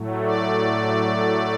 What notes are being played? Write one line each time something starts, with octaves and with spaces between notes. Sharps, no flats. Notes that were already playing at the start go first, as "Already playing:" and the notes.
Already playing: A2 F#3 A3
D5